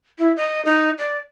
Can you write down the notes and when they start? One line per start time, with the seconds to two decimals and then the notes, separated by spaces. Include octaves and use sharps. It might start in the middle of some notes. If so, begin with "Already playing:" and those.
0.19 E4
0.37 D#5
0.65 D#4
0.98 D5